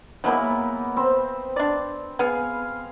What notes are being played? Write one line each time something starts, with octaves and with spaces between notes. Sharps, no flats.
F#3 G#3 A#3 B3 D#4 E4
C4 B5
D4 D5
B3 G#4 F5